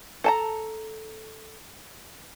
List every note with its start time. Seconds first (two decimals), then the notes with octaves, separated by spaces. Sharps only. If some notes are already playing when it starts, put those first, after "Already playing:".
0.24 A4 A5 A#5